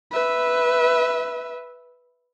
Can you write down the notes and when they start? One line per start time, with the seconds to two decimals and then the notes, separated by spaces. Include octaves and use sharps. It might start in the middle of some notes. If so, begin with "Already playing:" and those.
0.11 B4 E5